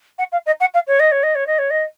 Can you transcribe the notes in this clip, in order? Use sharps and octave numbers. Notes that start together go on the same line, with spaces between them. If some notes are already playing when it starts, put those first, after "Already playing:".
F#5
F5
D#5
F#5
F5
C#5
D#5
C#5
D#5
C#5
D#5
C#5
D#5